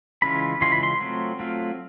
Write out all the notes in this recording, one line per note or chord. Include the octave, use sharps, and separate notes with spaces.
C#3 E3 G#3 C#4 F4 B5
C#3 E3 G#3 C#4 F4 C6
B5
C6
F#3 A3 C4 F4
F#3 A3 C4 F4